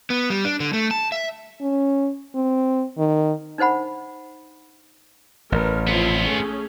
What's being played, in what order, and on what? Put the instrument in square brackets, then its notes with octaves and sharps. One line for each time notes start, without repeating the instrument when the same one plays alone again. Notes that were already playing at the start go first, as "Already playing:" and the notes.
[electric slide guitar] B3
G3
D4
D3
A3
A5
E5
[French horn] C#4
C4
D#3
[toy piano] D4 D#4 C5 F#5 B5
[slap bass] A1 [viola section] A#4 B4
[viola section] F3 C4 E4 [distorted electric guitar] B3 F4
[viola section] A3 C#4 G#4